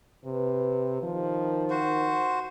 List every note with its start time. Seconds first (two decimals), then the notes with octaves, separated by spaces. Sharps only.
0.25 C3 B4
1.03 D#3 F3
1.70 F#4 C5